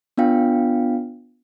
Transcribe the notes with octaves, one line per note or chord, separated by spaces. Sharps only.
B3 D4 F4 F5 G5